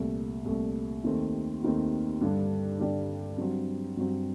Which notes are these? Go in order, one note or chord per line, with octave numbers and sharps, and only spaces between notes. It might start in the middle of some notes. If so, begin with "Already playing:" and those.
Already playing: C2 A#2 A3
C2 A#2 A3
D#2 D#3 A3 C4
D#2 D#3 A3 C4
G2 D3 G3 D4
G2 D3 G3 D4
G2 F#3 C4
G2 F#3 C4